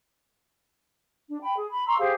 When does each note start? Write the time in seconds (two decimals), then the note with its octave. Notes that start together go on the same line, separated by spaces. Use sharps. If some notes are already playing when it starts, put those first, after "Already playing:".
1.30 D4
1.41 G5 B5
1.57 G#4
1.71 B5
1.87 A#5 C6 C#6 E6
1.99 G4 G#4 C5 F5